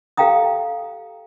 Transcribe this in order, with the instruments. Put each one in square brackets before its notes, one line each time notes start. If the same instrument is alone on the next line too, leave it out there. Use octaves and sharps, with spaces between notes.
[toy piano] G4 A4 F5 G5 A#5 D#6